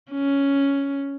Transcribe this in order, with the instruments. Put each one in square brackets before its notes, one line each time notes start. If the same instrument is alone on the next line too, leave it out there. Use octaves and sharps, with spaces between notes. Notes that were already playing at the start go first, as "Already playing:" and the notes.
[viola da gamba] C#4